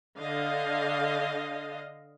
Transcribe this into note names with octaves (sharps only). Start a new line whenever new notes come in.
D3 D#5 F5